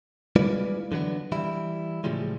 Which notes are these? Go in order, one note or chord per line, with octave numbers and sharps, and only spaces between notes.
G3 G#3 E4 F4 B4 D5
D3 E3 F#3 B3 D4
E3 G3 E4
A2 C#3 E3 F3 G3 G#3